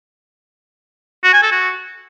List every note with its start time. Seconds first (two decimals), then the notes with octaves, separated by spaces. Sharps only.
1.24 F#4
1.33 G#5
1.42 A4
1.51 F#4